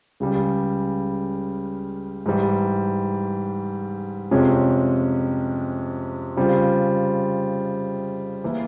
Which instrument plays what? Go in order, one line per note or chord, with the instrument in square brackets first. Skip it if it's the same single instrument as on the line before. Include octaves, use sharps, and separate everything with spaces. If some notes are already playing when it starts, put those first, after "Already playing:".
[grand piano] C#2 C#3 G3
G#2 E3 G3
F2 C3 F3 G#3 C#4
C#3 G3 C4 F4
E3 A#3